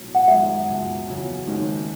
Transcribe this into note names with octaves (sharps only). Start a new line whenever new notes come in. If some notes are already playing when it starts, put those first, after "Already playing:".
Already playing: B1 A2 F#3
F#5
F#2 D#3 G#3 E5
C#2 B2 G#3
E2 C#3 F#3 C#4
G#1 G#2 D#3 G#3 C#4